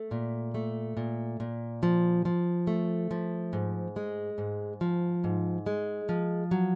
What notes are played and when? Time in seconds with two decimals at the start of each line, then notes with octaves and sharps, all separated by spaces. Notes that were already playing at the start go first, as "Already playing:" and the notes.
Already playing: A3
0.11 A#2
0.54 A3
0.97 A#2
1.40 A#2
1.83 F3
2.25 F3
2.67 A3
3.11 F3
3.53 G#2
3.96 G#3
4.38 G#2
4.81 F3
5.24 G#2
5.66 G#3
6.09 F3
6.51 F#3